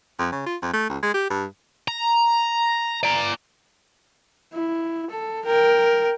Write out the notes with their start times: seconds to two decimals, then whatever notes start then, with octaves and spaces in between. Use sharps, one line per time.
0.19 F2
0.32 C#3
0.46 F4
0.62 F2
0.73 A3
0.90 C#2
1.03 G#3
1.14 G4
1.30 G2
1.88 A#5
3.03 D5 A#5
4.53 E4
5.10 A4
5.45 A#4 G5